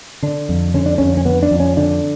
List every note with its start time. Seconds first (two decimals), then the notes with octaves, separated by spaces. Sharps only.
0.23 D3 D4
0.49 F2
0.74 D3 C#4
0.86 D4
0.98 F2 C#4
1.17 C#4
1.25 D3 B3
1.43 D4
1.51 F2
1.60 C#4
1.77 D3 D4